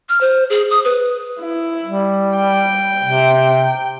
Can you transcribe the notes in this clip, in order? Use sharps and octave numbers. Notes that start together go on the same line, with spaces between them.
F6
C5
G#4
D#6
B4
E4
G3
G5
C3